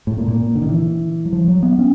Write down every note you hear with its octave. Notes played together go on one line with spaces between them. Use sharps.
A2
A#2
A#2
D3
D#3
E3
F#3
F3
F#3
B3
C#4